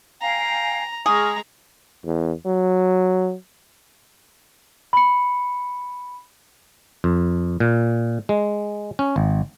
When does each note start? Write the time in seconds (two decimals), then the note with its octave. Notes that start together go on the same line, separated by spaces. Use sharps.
0.22 F5 G5 G#5 A#5
1.06 G#3 G#4 A#5 C#6 F6
2.05 E2
2.46 F#3
4.93 B5 C#7
7.04 F2
7.60 A#2
8.29 G#3
8.99 C#4
9.16 G#1